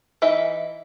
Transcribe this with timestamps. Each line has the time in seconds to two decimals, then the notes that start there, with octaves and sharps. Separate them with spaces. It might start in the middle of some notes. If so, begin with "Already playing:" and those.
0.22 E3 D#4 E5